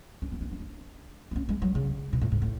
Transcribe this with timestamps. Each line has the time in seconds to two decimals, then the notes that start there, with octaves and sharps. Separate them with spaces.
0.22 C#4
0.32 B3
0.41 D4
0.51 C#4
0.59 D4
1.31 B3
1.36 C#4
1.49 G#3
1.62 F#3
1.75 C#3
2.13 B2
2.21 A2
2.32 G#2
2.42 A2